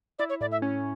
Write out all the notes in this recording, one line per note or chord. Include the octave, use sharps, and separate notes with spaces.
E4 D5
C#5
A2 D5
E5
C#4